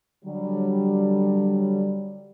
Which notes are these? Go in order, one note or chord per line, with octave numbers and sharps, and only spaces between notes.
D3 F#3 G3